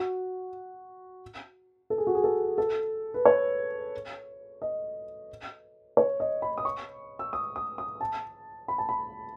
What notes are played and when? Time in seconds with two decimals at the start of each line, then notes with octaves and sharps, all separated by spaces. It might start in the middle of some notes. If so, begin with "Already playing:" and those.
Already playing: F#4
1.90 A4
1.98 G#4
2.07 F#4
2.15 G#4
2.24 A4
2.58 A4
3.14 B4
3.25 C#5
4.62 D#5
5.97 C#5
6.20 D#5
6.42 B5
6.58 D#6
6.65 C#6
7.19 E6
7.33 D#6
7.56 D#6
7.78 D#6
8.01 A5
8.68 B5
8.78 A5
8.89 B5